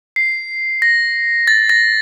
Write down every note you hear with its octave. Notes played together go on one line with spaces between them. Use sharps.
C7
A#6
A6
A#6